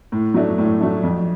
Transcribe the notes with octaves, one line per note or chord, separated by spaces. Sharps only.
A2
F#3 A3 D4
A2
F#3 A3 D4
F2